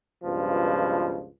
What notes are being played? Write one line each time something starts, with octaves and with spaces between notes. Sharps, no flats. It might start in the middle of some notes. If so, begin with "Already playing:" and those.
C#2 G2 B2 F3